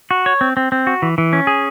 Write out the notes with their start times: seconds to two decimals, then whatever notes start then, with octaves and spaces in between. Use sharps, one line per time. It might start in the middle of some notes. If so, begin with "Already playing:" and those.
0.11 F#4
0.26 C#5
0.41 C4
0.57 C4
0.72 C4
0.87 F#4
1.02 E3
1.18 E3
1.33 C#4
1.47 G#4